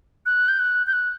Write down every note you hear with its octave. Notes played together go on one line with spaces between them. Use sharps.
F#6
G6
F#6
G6
F#6